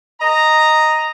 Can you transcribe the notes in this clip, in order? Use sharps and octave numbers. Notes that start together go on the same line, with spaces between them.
D#5 A#5